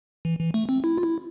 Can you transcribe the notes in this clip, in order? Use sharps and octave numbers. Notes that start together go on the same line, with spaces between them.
E3
E3
A3
C4
E4
F4
E4